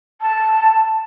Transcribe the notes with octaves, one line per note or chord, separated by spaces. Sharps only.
A5